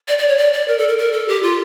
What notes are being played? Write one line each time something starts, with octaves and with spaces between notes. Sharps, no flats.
D5
D5
C#5
D5
D5
A#4
A4
A#4
A#4
A4
G4
F4